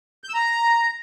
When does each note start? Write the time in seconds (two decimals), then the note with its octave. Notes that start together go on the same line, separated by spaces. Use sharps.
0.24 G6
0.29 E6
0.34 A#5